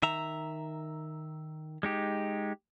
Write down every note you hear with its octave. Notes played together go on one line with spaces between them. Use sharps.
D#3 E5 A#5
G#3 D#4 G4